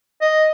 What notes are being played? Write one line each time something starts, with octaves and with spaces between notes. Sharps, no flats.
D#5